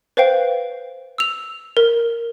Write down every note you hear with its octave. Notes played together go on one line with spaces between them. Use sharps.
B4 C5 F5 G5
E6 F7
A#4